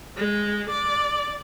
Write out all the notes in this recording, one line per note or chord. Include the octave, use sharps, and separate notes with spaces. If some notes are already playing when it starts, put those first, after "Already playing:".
G#3
D5